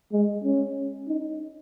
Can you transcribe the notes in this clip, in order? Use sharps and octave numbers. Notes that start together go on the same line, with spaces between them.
G#3
C#4
D#4